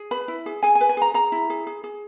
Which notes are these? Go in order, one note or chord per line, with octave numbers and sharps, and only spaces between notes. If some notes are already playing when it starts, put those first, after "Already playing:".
Already playing: G#4
B4 B5
E4
G#4
G#4 G#5
G#5
B4
G#5
G#4 A#5
G#4 A#5
E4
G#4
G#4
G#4